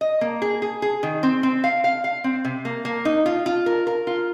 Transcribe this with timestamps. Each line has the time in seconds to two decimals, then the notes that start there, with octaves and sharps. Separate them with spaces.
0.01 D#5
0.21 A#3
0.42 G#4
0.62 G#4
0.82 G#4
1.03 D#3
1.23 C4
1.43 C4
1.64 F5
1.84 F5
2.04 F5
2.24 C4
2.45 C3
2.65 A#3
2.85 A#3
3.05 D#4
3.26 F4
3.46 F4
3.66 A#4
3.87 A#4
4.07 F4